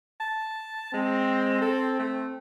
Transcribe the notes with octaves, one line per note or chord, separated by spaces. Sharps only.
A5
G#3 C4
A4
A3